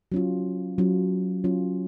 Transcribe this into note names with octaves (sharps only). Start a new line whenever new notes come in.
F#3 C#4 F4
F#3 C#4 F4
F#3 C#4 F4